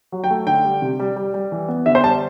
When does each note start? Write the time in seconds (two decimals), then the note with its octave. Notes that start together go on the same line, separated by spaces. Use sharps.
0.12 F#3
0.24 G5
0.30 A3
0.47 D3 G5
0.64 G3
0.82 C3
0.99 G3
1.16 G3
1.34 G3
1.52 E3
1.68 B3
1.86 D3 E5
1.95 C5
2.04 G3 A5